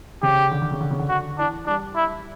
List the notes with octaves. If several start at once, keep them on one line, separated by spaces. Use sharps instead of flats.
C#3 G4
D3
D3
C#3
D3
C#3
D3
F#4
E3 D4
G3 D4
E4